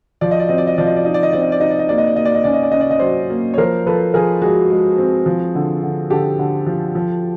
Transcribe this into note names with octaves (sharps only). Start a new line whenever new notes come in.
F3 D5
D#5
D5
C4 D#5
D5
D#5
F3 D5
D#5
D5
D#4 D#5
D5
D#5
C4 D5
D#5
D5
D#4 D#5
D5
D#5
A#3 D5
D#5
D5
A#3 D#5
D5
D#5
C#4 D5
D#5
D5
C#4 D#5
D5
D#5
F#3 C5 D5
A#3
C#5
F3 A#4 C5
F3 A4 B4
F3 G#4 A#4
G#3 F#4 G#4
G#3
C4
F3
D3
D3
D3 G4 A4
D3
F3
F3